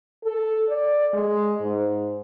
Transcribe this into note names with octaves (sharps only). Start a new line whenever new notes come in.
A4
D5
G#3
G#2